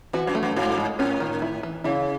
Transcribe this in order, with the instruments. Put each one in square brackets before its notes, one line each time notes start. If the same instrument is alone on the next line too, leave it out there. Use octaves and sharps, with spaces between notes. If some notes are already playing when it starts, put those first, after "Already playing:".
[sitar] E3 [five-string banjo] F#4
[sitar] F#2
[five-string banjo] A3
[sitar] F#2
[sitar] G#2 [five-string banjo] F#4
[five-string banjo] G#3
[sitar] A2 [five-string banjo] C#4
[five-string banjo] D#3
E4
E3
[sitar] C#3 [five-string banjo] E4